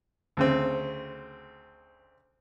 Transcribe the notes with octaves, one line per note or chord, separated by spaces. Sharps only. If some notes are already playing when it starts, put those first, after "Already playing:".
D2 C#3 C4